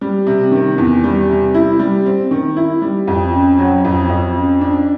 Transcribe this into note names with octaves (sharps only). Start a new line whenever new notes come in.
G3
C3
D#3
E2
G3
C3
E4
G3
C4
D#3
E4
G3
F2
C#3
F#3
F2
F2
C#3
D4